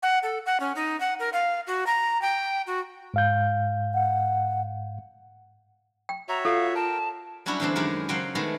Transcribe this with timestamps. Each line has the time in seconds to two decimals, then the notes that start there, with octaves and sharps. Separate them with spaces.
0.03 F#5
0.23 A4
0.46 F#5
0.60 C#4
0.76 D#4
1.00 F#5
1.19 A#4
1.33 F5
1.67 F#4
1.87 A#5
2.22 G5
2.67 F#4
3.14 G#2 F5 G6
3.94 F#5
6.09 G5
6.29 F#4 C#5 E5 A#5
6.45 F4 A4 F5
6.75 A#4 G5 A5
7.46 F#3 G3 C#4 D4 E4 F#4
7.60 E2 D3 G#3 C4 D4
7.75 F#2 D#3 G#3 G4 A#4 F#5
8.09 C#3 F#3 C5 F#5 G5
8.35 D#3 G#3 A3 B3